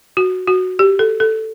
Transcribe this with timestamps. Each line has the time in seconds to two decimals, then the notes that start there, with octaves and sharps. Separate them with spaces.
0.17 F#4
0.47 F#4
0.79 G4
0.99 A4
1.20 A4